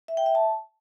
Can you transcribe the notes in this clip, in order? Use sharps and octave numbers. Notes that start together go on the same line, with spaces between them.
E5
G5
E5
A5